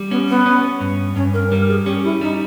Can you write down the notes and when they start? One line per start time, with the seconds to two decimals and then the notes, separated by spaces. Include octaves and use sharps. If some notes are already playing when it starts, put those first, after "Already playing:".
Already playing: G3
0.11 B3 C#4
0.29 B3
0.46 C#4
0.81 G2
1.16 G2 C#4
1.34 A#4
1.51 G3 A#4
1.69 G#4
1.86 C#4 G4
2.04 E4
2.21 G3 D#4